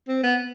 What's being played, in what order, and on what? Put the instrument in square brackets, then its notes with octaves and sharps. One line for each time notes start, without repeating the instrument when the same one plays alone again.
[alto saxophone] C4
B3